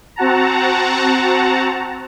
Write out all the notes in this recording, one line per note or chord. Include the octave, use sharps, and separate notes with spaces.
C4 F#4 F#5 A5 A#5